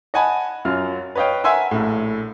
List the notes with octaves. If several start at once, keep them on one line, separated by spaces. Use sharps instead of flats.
D#5 F#5 G#5 A5 B5
F#2 F#3 F4 F6
B4 C#5 D#5 F5 G5
A#4 E5 F#5 G#5 C6 E6
A#1 A2